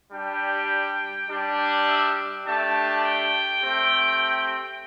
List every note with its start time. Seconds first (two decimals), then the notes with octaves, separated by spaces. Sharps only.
0.10 G3 D4 G4 G5
1.28 G3 D4 G4
1.87 E5
2.45 A3 D4 G4 A5
3.03 G5
3.62 A3 C4 G4